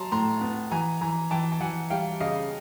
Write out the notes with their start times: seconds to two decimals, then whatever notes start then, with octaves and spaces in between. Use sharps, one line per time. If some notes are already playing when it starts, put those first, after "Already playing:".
Already playing: F#3 A5 A#5 C6
0.12 A2 A#5 C6
0.41 B3
0.71 E3 G#5 A#5
1.01 E3 G#5 A#5
1.31 E3 G5 A5
1.52 A5
1.60 E3 F#5 G#5
1.90 G3 F5 G5
2.20 C#3 D#5 F5